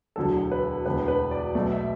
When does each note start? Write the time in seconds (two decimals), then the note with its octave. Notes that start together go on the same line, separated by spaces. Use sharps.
0.16 E1 D2 D3 F#3 A4
0.52 B4
0.85 E1 D2 D3 B3 B4
1.08 B4
1.31 D5
1.55 B1 B2 A3 D5
1.71 E5